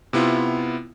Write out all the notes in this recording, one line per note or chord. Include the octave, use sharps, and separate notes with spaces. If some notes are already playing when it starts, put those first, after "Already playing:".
C3 B3 E4 F4